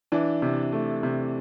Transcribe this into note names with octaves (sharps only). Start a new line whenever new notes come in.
E3 D4
C3
A3
C3